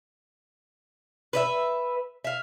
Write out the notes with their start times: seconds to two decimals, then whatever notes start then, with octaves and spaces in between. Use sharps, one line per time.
1.33 B4 D5 E5
2.24 E5 F5